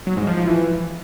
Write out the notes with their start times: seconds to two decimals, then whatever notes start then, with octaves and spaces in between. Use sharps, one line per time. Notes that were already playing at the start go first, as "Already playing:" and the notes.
0.07 F#3
0.17 G#2
0.27 F3
0.37 F3
0.47 E3